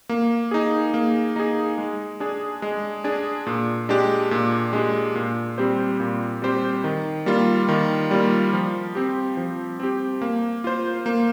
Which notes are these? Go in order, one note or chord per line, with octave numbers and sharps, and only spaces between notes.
A#3
D#4 G#4
A#3
D#4 G#4
G#3
D4 G#4
G#3
D4 G#4
A#2
G#3 D4 G4
A#2
G#3 D4 G4
A#2
G3 C4 G4 C5
A#2
G3 C4 G4 C5
D#3
G3 A#3 F4
D#3
G3 A#3 F4
F3
C4 G4
F3
C4 G4
A#3
F4 C5
A#3